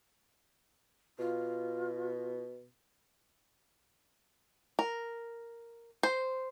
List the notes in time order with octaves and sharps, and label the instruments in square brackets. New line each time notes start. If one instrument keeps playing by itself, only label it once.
[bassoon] B2 [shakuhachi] F4
[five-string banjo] A#4
C5